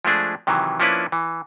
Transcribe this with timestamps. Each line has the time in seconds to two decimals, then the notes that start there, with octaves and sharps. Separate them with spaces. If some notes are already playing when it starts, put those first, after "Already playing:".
0.05 F3 G#3 A3 D4 G#4
0.47 C3 D#3 E3 F#3
0.80 F3 A#3 C#4 D4 E4 B4
1.12 E3